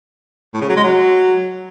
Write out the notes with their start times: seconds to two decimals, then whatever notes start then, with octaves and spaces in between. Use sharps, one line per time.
0.54 A2
0.61 C#3
0.69 F#3
0.76 G#3
0.84 F#3